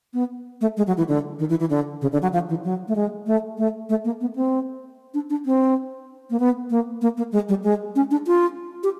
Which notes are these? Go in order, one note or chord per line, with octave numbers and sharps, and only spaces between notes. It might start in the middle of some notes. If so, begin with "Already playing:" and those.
B3
A3
G#3
F#3
E3
D3
D#3
E3
E3
D3
C#3
D3
F#3
F3
E3
F#3
A3
G#3
A3
A3
A3
A#3
B3
C4
D4
D4
C4
A#3
B3
A#3
A#3
A#3
G#3
G3
G#3
C#4
D4
F4
G4